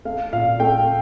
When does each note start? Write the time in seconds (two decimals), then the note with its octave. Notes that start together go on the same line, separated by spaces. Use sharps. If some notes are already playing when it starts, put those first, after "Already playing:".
0.05 A3 F5
0.33 A#2 F5
0.60 A3 G5